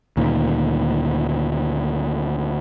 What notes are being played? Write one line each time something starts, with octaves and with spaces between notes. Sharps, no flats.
D2 A#2 D#3